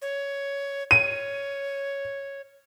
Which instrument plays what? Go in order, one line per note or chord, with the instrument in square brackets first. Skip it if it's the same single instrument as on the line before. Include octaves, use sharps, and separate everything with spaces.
[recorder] C#5
[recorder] C#5 [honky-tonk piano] D#7